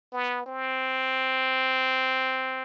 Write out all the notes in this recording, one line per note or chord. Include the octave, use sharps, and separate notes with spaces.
B3
C4